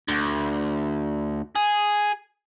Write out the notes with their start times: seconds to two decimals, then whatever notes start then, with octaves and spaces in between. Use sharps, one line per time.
0.08 D2
1.56 G#4